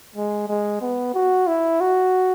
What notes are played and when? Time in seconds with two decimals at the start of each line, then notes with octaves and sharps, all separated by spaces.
0.16 G#3
0.48 G#3
0.82 B3
1.14 F#4
1.47 E4
1.81 F#4